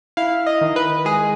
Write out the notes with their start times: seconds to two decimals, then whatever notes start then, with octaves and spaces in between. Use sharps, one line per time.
0.17 E4 F5
0.47 D#5
0.61 D#3
0.76 B4
1.05 G#3 G#4